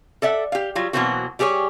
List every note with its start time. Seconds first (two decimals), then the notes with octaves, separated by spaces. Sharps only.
0.22 A4 D5 E5 F#5
0.52 G4 F5
0.75 F#3 G3 F4
0.93 B2 E3 F#3 A#3 C4 F#4
1.39 G3 G4 G#4 A#4 C#5